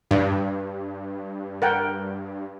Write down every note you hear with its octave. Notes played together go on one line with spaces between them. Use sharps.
G2
A#4 F#5 G5